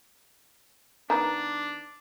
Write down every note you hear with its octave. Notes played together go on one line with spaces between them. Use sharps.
D#3 B3 D4 A#5 B5